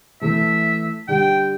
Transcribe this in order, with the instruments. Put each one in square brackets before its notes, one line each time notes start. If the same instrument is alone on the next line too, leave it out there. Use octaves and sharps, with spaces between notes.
[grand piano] E3 A3 [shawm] E5
[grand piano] D3 G3 [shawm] G5